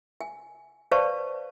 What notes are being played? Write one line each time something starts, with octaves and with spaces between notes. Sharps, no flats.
G#5
B4 C5 D5 F5 A5 C#6